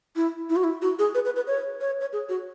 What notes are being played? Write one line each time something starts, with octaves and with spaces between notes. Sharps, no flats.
E4
E4
F#4
E4
F#4
G#4
B4
B4
B4
C#5
C#5
C#5
G#4
F#4